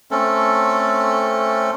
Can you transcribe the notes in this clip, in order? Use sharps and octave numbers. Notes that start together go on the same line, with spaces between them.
A3 C4 C#4 A4